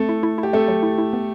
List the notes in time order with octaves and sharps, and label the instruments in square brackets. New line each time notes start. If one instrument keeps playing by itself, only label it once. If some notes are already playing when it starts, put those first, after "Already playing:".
Already playing: [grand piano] A3 A4 [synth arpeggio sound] C4
[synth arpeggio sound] E4
E4
E4
[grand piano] G4
[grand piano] A3 A4 [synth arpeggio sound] C4
[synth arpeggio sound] F#3
E4
E4
B3